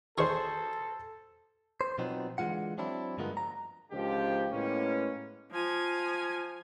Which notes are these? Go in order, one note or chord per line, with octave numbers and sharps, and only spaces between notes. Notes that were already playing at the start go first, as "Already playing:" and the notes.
D#3 G#4 A4 C5 C#6
C5
B2 F3 F#3 B3 C4 D#4
D3 E3 G#3 F4 F#5
F#3 C4 D4 E4
G2 D3 F3 G#3 A#3 B3
A#5
C#2 D3 D#3 F3 G4
A2 G#3 A#3 B3 C#4
F3 G#5